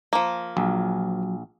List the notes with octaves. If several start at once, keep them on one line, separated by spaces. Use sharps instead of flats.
F3 A#3
A#1 F#3